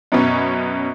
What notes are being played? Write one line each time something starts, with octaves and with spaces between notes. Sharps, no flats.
F#2 B2 B3 C#4